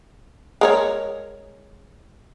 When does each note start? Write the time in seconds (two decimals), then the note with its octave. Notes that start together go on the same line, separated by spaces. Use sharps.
0.61 G#3 A#4 C#5